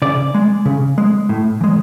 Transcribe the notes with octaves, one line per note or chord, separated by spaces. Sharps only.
C#3 D5
G#3
C#3
G#3
A2
E3 G#3